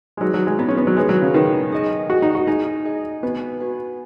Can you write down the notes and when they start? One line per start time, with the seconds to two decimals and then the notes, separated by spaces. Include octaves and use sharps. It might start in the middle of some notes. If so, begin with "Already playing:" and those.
0.17 G#3
0.21 F#3 D#4 G#4 B4
0.34 F#3
0.47 G#3
0.59 B3 D#4 G#4 B4
0.69 C#4
0.77 B3
0.87 F#3
0.97 G#3 D#4 G#4 B4
1.09 F#3
1.22 C#3
1.34 D#3 D#4 G#4 B4
1.72 G#4 D#5 G#5
2.10 F#4 G#4 D#5 G#5
2.22 D#4
2.35 F#4
2.47 D#4 G#4 D#5 G#5
2.85 G#4 D#5 G#5
3.23 B3 F#4 B4 G#5
3.60 F#4 B4 G#5